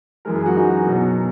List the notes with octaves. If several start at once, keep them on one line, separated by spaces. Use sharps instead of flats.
F#2 E3 G#3 A#4
G#4
F#4
D#4
B2 F#3